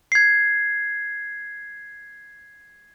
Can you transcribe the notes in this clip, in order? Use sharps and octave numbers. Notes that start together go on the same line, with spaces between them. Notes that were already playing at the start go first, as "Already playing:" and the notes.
G#6 C7